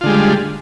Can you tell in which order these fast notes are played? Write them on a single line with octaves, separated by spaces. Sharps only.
F4 D3 G#3 G3